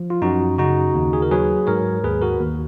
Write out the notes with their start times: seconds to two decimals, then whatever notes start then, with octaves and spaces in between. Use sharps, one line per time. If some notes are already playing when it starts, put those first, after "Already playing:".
Already playing: F3
0.10 F4
0.22 F#2 D#4 F#4
0.58 C#3 D#4 F#4
0.94 D#2
1.13 G#4
1.22 A#4
1.31 F#3 G#4 B4
1.67 G#2 A#4 C#5
2.04 D#2 G#4 B4
2.22 F#4 A#4
2.40 D#2